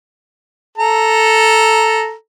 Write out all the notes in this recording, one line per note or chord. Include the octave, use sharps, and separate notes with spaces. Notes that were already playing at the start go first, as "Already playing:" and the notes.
A4 A#5